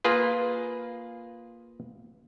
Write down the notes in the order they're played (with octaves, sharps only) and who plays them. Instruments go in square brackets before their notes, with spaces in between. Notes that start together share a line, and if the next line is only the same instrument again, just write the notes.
[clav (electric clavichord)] A#3 F4 G#4 B4